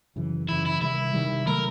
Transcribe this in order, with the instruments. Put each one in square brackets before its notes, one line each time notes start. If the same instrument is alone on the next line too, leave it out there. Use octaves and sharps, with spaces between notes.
[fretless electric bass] F#2 C#3 E3
[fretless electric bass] F#2 C#3 E3 [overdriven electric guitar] E4
[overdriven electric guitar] E4
[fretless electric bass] C3 D#3 G3 [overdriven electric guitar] E4
[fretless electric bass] C3 D#3 G3
[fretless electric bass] C3 D#3 F#3 A3 [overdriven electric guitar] A#4